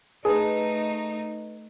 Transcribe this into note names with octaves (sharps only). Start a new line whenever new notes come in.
A3 D#4 G#4 B4 A5